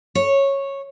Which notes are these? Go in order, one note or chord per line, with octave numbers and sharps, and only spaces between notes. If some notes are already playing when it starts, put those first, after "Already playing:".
C#5